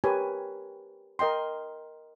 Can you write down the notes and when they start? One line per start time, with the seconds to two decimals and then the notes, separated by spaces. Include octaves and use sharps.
0.04 G4 A#4 B4 C#5 G#5
1.19 A#4 D#5 G5 C6